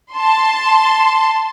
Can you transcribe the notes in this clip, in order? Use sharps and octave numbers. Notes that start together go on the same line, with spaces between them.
A5 C6